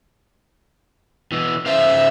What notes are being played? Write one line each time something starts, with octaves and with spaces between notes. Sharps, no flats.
B2 E3
C#3 C5 E5 F5